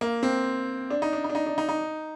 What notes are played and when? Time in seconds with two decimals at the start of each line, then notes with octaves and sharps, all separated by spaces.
0.01 A#3
0.23 C4
0.90 D4
1.02 D#4
1.13 D4
1.24 D#4
1.30 D4
1.35 D#4
1.46 D4
1.58 D#4
1.69 D#4